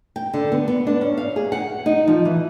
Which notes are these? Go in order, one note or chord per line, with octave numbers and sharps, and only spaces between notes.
G5
D3
B3
B3
D4
C#4
F5
G#4
F#5
D#4
F3
E3